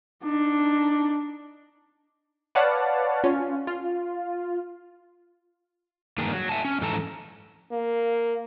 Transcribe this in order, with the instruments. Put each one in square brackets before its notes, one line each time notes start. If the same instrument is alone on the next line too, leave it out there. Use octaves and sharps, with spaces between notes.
[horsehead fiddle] D4 D#4
[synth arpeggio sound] B4 C#5 D5 F5 F#5 A5
C#4 F4
F4
[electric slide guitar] G2 D#3 A#3 D4 G#4
F#3
E5 F5 G#5 A5
C#4
G#2 E3 F3 A4 A5 A#5
[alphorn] A#3